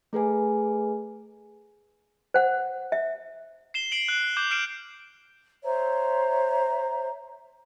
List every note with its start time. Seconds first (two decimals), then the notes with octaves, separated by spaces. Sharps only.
0.13 A3 G#4 B4 G#5
2.34 C5 F#5
2.92 E5
3.74 C7 E7 G7
3.92 C7 D7 F#7
4.08 F#6
4.37 D6 G6 E7
4.51 F6 G6 C7 D7 E7
5.64 C5 C#5 E5 A#5